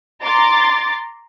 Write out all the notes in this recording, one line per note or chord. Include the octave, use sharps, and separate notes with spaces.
A#5 C6 D6 A6